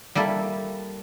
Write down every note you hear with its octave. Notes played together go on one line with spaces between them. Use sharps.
G3 A#3 E4 A4